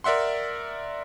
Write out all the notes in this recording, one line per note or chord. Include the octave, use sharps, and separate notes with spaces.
A#4 D5 E5 F#5 C6